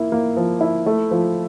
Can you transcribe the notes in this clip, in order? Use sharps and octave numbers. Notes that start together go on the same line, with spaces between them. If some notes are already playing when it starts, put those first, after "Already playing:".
Already playing: A#3 E4
A#3
F3
E4
A3
F3